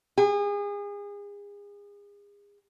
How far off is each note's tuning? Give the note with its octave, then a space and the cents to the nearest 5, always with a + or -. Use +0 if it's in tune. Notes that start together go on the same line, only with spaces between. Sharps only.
G#4 -35